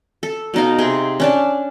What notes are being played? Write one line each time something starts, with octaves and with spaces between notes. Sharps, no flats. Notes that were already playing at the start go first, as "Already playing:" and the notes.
A4
B2 D#4 F5
C3 C4 G#4
C#4 D4 A5